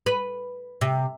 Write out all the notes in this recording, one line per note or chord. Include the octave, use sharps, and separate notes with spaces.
B4
C3